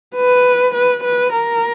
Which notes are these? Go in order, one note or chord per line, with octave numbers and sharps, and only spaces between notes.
B4
B4
B4
A#4